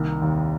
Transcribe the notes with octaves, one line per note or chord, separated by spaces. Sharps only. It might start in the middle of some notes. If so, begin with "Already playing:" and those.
Already playing: C2 D#3 A#3
D#2